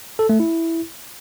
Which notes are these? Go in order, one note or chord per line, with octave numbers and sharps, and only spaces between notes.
A4
A3
E4